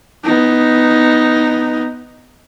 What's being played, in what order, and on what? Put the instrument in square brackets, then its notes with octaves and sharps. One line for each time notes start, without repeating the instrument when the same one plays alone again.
[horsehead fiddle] B3 D#4